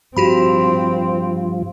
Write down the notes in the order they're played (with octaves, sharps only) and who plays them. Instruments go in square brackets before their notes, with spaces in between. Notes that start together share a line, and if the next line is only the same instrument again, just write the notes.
[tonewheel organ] G2 F3 [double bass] C4 [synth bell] F#4 G4 B5